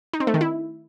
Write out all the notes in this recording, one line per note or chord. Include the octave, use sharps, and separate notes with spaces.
D#4
C4
A3
D#3
E4